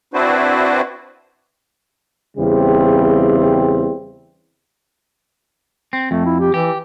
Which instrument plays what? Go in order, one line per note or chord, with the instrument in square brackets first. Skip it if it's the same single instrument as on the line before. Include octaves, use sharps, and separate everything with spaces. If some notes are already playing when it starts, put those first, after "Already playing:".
[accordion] C4 D4 E4 F#4 B4 C5
[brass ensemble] E2 C#3 G3 C4
[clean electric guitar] C4
[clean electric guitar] F2 [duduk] A3
[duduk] E4
G4
[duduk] E3 [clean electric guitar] G4